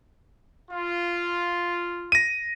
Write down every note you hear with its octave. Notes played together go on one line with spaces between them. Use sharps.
F4
A#6 D#7